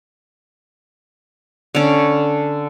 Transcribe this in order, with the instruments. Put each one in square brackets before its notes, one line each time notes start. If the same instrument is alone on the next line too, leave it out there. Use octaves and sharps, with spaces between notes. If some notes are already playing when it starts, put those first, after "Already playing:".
[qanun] D3 C#4